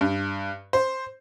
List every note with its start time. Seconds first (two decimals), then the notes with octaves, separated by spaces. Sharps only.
0.01 G2
0.73 C5